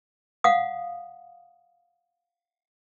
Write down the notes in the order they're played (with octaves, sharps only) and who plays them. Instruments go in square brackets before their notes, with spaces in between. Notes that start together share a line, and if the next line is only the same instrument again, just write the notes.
[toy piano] F5 F#5 D#6